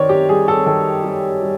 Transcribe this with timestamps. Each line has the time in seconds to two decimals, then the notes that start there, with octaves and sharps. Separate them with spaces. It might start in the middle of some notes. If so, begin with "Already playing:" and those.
Already playing: F#2 D#3 C4 C#5 D5
0.09 G4
0.29 G3 G#4
0.48 A4
0.66 D#3 A4
1.03 G3
1.42 G3